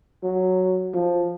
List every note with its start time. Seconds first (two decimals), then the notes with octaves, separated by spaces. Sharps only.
0.23 F#3
0.93 F3